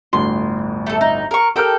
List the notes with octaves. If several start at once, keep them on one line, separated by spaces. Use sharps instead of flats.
G1 D2 A2 C6
A3 A4
D#4
A#4 C#6
G4 A4 A#4 G5 F6